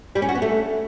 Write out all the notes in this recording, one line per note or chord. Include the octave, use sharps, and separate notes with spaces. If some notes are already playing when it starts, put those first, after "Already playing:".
G3
C#4
F#4
B3
A3